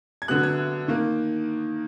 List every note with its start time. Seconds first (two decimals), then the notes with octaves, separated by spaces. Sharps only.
0.22 G#6
0.28 D3 F#3 B3 F#6
0.43 G#6
0.88 D#3 A#3